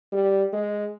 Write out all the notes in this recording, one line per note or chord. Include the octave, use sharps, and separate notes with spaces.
G3
G#3